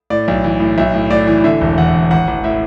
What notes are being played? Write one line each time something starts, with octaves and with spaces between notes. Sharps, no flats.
A2 D5
B1
E3
A2
B1 E5
A2
A2 D5
E3
D3 E5
E1
E2 F#5
E2
A1 F#5
A1
A2 E5